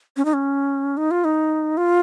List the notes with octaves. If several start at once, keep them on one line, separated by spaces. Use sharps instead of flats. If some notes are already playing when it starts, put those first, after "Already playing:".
C#4
D#4
C#4
D#4
F4
D#4
F4